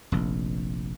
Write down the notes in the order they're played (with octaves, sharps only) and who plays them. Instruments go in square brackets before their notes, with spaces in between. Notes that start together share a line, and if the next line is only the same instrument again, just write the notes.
[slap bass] F1 A#1